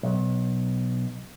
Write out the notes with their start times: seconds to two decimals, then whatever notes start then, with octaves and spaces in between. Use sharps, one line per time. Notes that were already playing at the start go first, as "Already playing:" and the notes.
0.03 B1